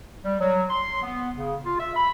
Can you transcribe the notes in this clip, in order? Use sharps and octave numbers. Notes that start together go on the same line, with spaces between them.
G3
F#3
C6
B3
C#3
F4
E5
B5